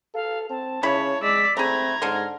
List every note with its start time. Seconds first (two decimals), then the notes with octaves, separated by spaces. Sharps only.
0.14 A4 F5
0.50 C4 A5
0.83 C#3 E4 C#5 B5
1.22 G#3 D5 E6 B6
1.57 A3 C4 G#4 A#5 B5 G#6
2.02 G#2 D3 C5 C6 F6